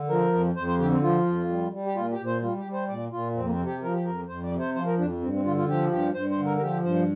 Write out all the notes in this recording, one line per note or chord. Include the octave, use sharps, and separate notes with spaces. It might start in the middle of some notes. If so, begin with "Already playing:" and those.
Already playing: D3
F3 A#4
F2
F2 C5
C5
D3 G4
C4
F3 F4
F2
G3
G3
G4
A#2 F4
G4
A#2
C5
G3 F4
G4
G3
C5
A#2 D5
A#2 F4
F2 C4
A#3
C4
C3
G4
F3 A#4
G4
F2 A#4
F2 C5
D5
C3
C5
F3 C5
A#4
F2 D4
G2 C4
C4
D3 F4
F4
F3 G4
G2 G4
G2 C5
C5
D3
A#4
A#4
F3 G4
G2 C5